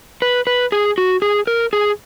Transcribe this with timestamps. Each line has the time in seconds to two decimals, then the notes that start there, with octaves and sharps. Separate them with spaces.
0.22 B4
0.47 B4
0.72 G#4
0.98 F#4
1.22 G#4
1.47 A#4
1.73 G#4